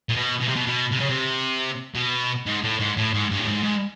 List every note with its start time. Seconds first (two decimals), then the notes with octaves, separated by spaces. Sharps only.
0.09 A#2
0.16 B2
0.41 B2
0.48 C3
0.56 B2
0.67 B2
0.92 C3
1.00 C#3
1.09 C3
1.95 B2
2.46 G#2
2.63 A2
2.80 G#2
2.97 A2
3.14 G#2
3.31 G2
3.40 A2
3.48 G#2
3.64 G#2